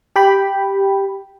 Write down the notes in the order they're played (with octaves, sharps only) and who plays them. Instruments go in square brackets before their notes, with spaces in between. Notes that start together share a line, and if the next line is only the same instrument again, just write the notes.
[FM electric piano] G4 G5 B5